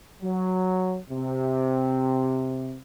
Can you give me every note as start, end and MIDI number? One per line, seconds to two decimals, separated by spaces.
0.23 0.97 54
1.10 2.77 48